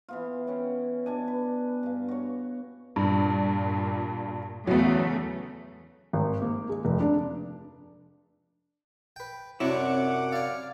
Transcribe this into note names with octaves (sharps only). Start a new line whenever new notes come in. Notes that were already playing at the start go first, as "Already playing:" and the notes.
E3 B3 F4
C#4 C#5 F#5 G5
B2 D4 G#5
B4
G2 F5
F#4 C#5
G2 A#2
E2 C#3 F#3 A3 B3
G#1
A#3
G#3
F1
D4
B4 G5
F#2 C3 D4 E4 F#4 C#5 F#5 D6
C#5 D5 F5